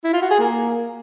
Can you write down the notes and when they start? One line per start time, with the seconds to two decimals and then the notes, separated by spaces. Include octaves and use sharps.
0.04 E4
0.13 F4
0.22 F#4
0.30 G#4
0.39 A#3